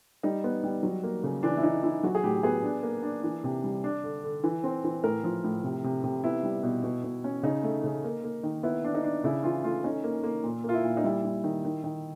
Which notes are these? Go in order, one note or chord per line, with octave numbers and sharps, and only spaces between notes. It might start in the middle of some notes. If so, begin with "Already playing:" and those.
G3 D#4
B3
G3
F#3
A#3
C#3
E3 D4
E4
E3 D#4
E3 E4
F#3 F#4
G#4
A2 G4
B3 G#4
D4
A#3
D4
E3
C3
G3
D4
D3
D3
E3
C4
E3
A2 A#4
F3
A2
C3
C3
C3
B3 E4
G3
B2
B2
B2
C#4
C#3 D#4
A3
C#3
A#3
A#3
D#3
B3 E4
D4
D#4
D4
C#3 E4
E3 F4
A3 F4
C#4 D#4
A#3
A#3
A#2
A#3 F4
E4
A#2
D#4
G3 E4
G3
D#3
D#3
D#3